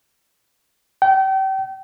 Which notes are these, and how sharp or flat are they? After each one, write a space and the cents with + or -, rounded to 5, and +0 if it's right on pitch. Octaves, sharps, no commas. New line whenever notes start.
G5 -35